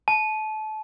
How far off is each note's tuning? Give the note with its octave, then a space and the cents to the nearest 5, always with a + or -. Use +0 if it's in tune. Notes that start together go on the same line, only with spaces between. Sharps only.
A5 -30